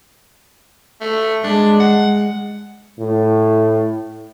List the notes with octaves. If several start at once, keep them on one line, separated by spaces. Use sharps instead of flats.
A3
G#3 D4
F#5
A2